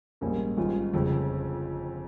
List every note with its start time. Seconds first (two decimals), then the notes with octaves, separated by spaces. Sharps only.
0.21 A#1 G#2 G3 A#3 C#4
0.57 G#1 G#2 G3 C#4 F4
0.93 G1 F2 C#3